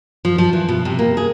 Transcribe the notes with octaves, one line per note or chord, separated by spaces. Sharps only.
F3
F3
E3
B2
C3
A#3
G#4